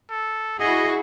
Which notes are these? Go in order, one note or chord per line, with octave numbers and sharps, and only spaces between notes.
A4
E4 F#4 G#4 D#5